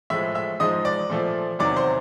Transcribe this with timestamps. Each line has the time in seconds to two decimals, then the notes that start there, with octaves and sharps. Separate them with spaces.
0.10 A2 F3 G#3 E5 E6
0.35 E5 E6
0.60 G#2 F3 G#3 D#5 D#6
0.85 D5 D6
1.10 A#2 F3 A3
1.59 E2 C3 D#3 F#3 D5 D6
1.76 C5 C6